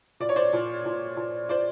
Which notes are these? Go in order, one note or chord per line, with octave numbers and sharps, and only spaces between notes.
A#2 D5
C#5
C5 D5
A#2
A#2
A#2
A#2 C5 D5